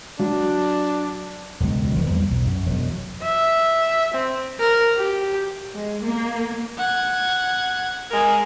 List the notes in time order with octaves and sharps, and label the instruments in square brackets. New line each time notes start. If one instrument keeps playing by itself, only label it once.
[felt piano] F#3 [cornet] D4
[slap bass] E1 C#2 F#3 G#3
E1 D#3
E2 G3 A#3
B1
F#2
E1 F#3
[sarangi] E5
C4
A#4
G4
[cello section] G#3
A#3
[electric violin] F#5 G#6
[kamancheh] G#3 A#4